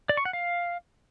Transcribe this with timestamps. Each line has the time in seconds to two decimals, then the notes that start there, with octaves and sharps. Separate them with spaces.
0.09 D5
0.17 C#6
0.25 F#5
0.33 F5